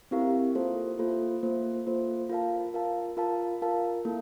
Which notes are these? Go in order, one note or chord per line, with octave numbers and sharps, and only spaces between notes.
C4 E4 G4 A#4 F5
A#3 F4 A4 C5
A#3 F4 A4 C5
A#3 F4 A4 C5
A#3 F4 A4 C5
F4 A#4 F5 A5
F4 A#4 F5 A5
F4 A#4 F5 A5
F4 A#4 F5 A5
A#3 E4 A4